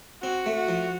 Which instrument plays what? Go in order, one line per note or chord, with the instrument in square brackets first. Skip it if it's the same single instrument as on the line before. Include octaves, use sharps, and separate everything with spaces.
[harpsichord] C4 [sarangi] F#4
[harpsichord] A3
[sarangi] F#4
[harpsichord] F3